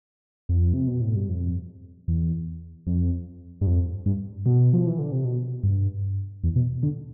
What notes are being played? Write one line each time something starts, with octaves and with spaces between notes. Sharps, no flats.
F2
C3
B2
A2
G2
F2
E2
F2
G2
F2
G2
B2
F3
E3
D3
C3
B2
G2
E2
B2
D3